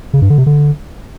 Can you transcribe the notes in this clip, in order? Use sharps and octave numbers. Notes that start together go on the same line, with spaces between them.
C#3
G2
D3
C3
D3